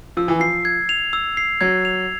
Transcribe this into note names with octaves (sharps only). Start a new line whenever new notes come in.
F3 E6
E3
F3 C7
G#6
F7
E6
C7
F#3 G#6
F7